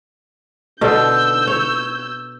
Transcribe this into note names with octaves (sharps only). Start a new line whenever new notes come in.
B2 D3 A4 E6 G6
C#5